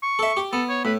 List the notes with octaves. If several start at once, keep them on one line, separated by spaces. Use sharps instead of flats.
C#6
A4 E5
G4
B3 A4
C#5
A2 B4